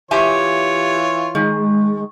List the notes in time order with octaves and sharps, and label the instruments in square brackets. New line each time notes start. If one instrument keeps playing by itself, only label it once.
[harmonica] E3 F4 C#5 [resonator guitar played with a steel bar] G4 E5 G#5
[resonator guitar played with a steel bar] D#3 [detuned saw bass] G#3